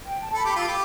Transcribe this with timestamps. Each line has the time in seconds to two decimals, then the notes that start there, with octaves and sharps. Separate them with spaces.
0.07 G5
0.20 A5
0.34 A4 B5
0.45 G4 B5
0.56 F4 E6
0.63 G4 D6